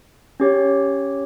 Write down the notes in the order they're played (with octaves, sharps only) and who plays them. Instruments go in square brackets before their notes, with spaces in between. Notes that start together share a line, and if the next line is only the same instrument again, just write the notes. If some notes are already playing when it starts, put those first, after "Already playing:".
[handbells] C#4 G4 C#5